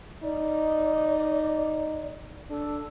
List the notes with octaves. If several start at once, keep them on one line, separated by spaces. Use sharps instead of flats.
D#4 D5
D4 A4